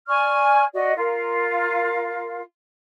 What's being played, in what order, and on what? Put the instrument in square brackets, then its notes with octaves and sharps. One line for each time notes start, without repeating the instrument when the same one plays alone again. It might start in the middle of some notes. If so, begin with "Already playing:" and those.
[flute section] D5 G#5 C#6 F6
F#4 D5 D#5
F4 A#4 F5